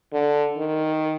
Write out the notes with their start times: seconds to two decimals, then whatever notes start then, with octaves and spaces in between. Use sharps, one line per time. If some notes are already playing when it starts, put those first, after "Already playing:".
0.13 D3
0.58 D#3